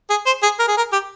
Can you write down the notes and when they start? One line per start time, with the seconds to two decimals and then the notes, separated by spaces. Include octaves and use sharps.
0.10 G#4
0.26 C5
0.43 G#4
0.60 A#4
0.68 G#4
0.77 A#4
0.92 G4